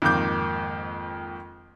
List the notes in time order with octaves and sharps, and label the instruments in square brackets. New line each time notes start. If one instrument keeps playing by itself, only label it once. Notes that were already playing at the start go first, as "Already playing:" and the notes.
[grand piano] F2 G#2 D#3 A#3 D6 G6